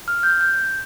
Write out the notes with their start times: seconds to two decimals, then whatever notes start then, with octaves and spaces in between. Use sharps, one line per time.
0.08 F6
0.23 G6
0.41 G6